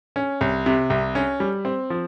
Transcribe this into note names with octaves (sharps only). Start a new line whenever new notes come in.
C#4
C2
C3
C2
C#4
G3
C4
F3